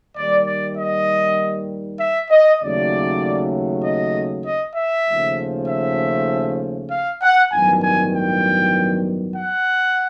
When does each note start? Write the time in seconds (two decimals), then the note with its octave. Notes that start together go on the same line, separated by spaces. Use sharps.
0.16 D#2 D#3 G3 D5
0.47 D5
0.78 D#5
2.00 E5
2.30 D#5
2.61 D#2 C#3 F#3 A3 D5
3.84 D#5
4.46 D#5
4.76 E5
5.07 D#2 C#3 F3 A3
5.68 E5
6.91 F5
7.22 F#5
7.52 A1 G2 D#3 F#3 B3 G#5
7.83 G#5
8.13 G5
9.37 F#5